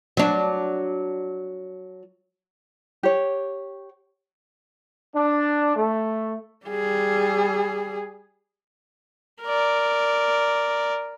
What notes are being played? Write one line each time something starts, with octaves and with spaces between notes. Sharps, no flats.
F#3 D4
G4 C#5
D4
A3
G3 G#4
A#4 D5